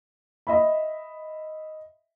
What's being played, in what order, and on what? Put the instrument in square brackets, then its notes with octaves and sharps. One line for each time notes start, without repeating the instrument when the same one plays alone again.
[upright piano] D#5 E5 B5